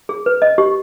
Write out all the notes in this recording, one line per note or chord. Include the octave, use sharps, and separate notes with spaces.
G#4
B4
D#5
G4